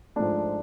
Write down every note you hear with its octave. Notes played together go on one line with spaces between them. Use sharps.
G#2 F3 A3 D4